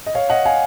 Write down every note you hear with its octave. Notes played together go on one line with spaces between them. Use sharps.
D#5
C#5 F5
D#5 F#5
F5 G#5